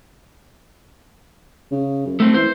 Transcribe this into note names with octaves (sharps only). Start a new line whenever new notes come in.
C#3
F#2
A3 C4
E3 C5